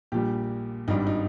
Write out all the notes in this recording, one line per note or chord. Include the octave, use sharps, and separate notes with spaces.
A#1 A#2 G3 G4
G#1 G2 G3 D#4
D#4